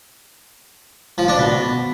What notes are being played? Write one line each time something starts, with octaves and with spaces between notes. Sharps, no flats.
F3
D4
B2